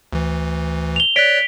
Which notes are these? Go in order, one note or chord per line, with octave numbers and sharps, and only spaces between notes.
D2 E3
F7 G7
C#5 D5 F#6 B6 D7